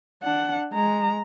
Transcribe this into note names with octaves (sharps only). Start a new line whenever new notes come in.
D4 F#5
G#3 A#5